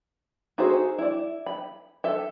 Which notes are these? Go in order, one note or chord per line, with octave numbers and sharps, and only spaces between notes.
D#4 F#4 G#4 A4 C5
E4 D5
B5
A4 E5